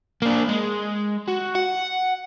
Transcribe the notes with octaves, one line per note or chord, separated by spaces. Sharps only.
A#3 D4
G#3
F#4
F#5